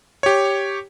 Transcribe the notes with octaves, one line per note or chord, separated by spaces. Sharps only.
G4 C#5